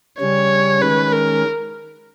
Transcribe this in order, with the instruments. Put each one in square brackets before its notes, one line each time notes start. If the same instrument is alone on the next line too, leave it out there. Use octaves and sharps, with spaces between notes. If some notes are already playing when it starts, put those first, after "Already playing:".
[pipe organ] C#3 G3 C#4 [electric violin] C#5
[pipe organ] D#3 G#3 C#4 [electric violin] B4
[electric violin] A#4